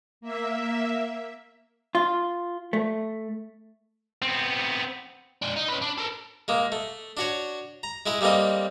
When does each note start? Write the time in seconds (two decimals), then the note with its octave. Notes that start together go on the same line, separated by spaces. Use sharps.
0.21 A#3 E5
1.95 F4
2.73 A3
4.22 B3 C4
5.42 G#3 D4
5.56 D#4
5.68 C#4 B4
5.82 D4
5.98 A4 A#4
6.48 G#3 A#3
6.72 A3
7.17 D4 F#4 C#5
7.83 A#5
8.06 G#3 E4 G#4
8.21 G3 A3 A#3 C4 D#5